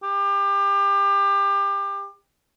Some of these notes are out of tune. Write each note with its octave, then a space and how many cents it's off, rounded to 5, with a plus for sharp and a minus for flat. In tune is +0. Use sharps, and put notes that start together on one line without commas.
G4 +25